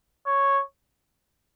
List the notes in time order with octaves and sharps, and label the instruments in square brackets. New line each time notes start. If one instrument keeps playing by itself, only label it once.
[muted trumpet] C#5